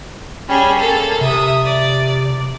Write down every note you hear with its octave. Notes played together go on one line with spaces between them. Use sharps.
G3 C#4 G#4
A#3 A4
C3 E5 D#6
D5